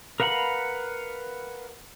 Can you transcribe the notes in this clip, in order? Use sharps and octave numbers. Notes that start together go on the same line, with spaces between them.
A#4 B4 F5 F#5 B5